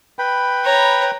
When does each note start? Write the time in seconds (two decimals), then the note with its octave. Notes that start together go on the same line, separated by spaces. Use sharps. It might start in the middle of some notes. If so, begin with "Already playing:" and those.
0.19 B4 G5 B5
0.64 C#5 A#5